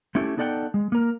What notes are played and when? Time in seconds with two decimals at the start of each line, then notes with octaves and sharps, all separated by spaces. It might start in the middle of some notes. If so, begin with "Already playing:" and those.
0.15 A3 C#4 E4 G4 A4
0.37 B3 D#4 A4 D5 F#5 G5
0.74 G#3
0.92 A#3 A#4